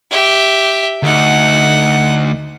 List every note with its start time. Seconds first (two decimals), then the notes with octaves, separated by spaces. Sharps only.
0.11 G4 E5
1.03 D2 D#4 F#5